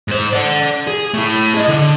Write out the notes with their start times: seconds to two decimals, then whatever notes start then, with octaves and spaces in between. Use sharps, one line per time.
0.08 G#2 C5
0.33 D5 F#5
0.87 G#4
1.14 A3 E4
1.54 G#4 D#5
1.68 D3